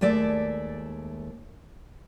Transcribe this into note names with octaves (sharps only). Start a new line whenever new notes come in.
D#2 G#3 A3 D5 E5